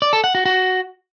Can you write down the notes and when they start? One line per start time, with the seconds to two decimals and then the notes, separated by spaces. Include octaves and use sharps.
0.02 D5
0.13 A4
0.24 F#5
0.35 F#4
0.46 F#4